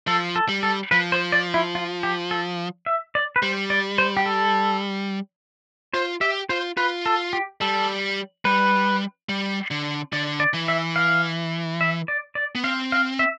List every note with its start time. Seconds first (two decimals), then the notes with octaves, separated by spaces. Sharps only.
0.07 F3 A4
0.36 A4
0.49 G3
0.63 A4
0.91 F3 B4
1.12 C5
1.32 D5
1.54 E4
1.75 F4
2.03 G4
2.31 A4
2.86 E5
3.15 D5
3.36 B4
3.42 G3 C5
3.70 D5
3.98 C5
4.17 G4
4.26 A4
5.93 F4 C5
6.21 G4 E5
6.49 F4 C5
6.77 F4 B4
7.06 A4
7.33 G4
7.61 G3 A4
8.45 G3 B4
9.29 G3
9.71 D3
10.13 D3 D5
10.40 D5
10.54 E3
10.68 E5
10.96 F5
11.81 E5
12.08 D5
12.35 D5
12.55 B3
12.64 C4 F5
12.92 F5
13.19 E5